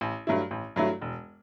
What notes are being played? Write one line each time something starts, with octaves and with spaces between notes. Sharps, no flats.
A1
G2 F#3 A3 E4
A1
G2 F#3 A3 E4
E1